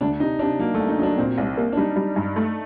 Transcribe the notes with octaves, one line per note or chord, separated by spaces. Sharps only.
D2 D4
C3 D#4
C3 D4
F#3 A#3
A3
C2
D#4
F#3 D4 D#4
A#2 C4
C2
A#3
D4
G3 D#4
G3
G2
A3